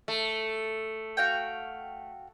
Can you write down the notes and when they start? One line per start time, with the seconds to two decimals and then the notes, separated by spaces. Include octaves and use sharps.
0.08 A3
1.17 F#4 F5 G5